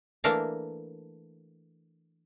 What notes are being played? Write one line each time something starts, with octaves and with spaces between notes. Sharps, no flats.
E3 A3 A#3 D4 A#4 A5